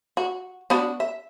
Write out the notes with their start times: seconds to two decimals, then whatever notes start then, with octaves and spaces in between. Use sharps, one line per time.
0.17 F#4
0.70 B3 D4 F#4
1.00 E5